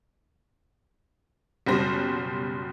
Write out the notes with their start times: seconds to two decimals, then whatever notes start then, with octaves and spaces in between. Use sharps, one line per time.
1.66 F#1 B2 G3 F#4 C5 A#6